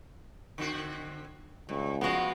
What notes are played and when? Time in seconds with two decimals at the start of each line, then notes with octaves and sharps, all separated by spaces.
0.58 D3 C4 F#4
1.69 C#2 G2
2.01 G2 F3 G#3 B3 F#4